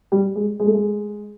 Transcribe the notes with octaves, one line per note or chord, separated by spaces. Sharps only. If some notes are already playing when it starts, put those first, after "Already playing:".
G3
G#3
G#3
A3
G#3